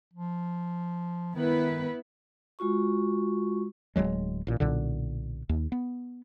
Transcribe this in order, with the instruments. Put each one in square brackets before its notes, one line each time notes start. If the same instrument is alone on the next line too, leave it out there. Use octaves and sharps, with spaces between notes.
[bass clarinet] F3
[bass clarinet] D#3 [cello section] B3 E4 B4
[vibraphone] G#3 F4 F#4 C#6
[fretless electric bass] D1 D#2 F#3 G#3
A1 A#2
B1 A#2 D3
D#2
B3